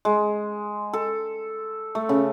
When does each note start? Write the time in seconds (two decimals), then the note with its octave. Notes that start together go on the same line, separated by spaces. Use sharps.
0.05 G#3
0.93 A4
1.95 A3
2.09 C#3